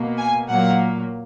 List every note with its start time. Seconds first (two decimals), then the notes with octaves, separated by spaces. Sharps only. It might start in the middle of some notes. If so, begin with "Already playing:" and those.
Already playing: B2 A#3
0.17 G#5
0.49 A#2 F#3 A#3 F#5